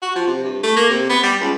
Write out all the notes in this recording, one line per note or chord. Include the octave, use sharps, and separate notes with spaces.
F#4
F3
C3
G2
A3
A#3
C3
B3
G3
C#2